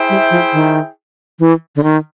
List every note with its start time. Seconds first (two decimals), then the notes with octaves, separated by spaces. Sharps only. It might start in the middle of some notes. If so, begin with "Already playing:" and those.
Already playing: E4 G#4 C5 E5 G5
0.09 G3
0.30 F3
0.53 D#3
1.39 E3
1.76 D3
1.83 D#3